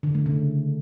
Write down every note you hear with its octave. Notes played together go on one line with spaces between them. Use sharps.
D3
A3
C#3